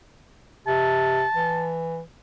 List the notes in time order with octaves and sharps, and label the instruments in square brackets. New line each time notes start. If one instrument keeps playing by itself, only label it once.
[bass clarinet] C3 [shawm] A5
[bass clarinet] E3